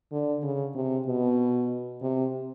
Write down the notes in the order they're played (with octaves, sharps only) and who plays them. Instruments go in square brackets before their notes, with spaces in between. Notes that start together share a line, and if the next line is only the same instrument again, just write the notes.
[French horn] D3
C#3
C3
B2
C3